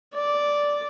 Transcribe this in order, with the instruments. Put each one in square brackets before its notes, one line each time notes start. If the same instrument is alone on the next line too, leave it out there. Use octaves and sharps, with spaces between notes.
[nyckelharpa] D5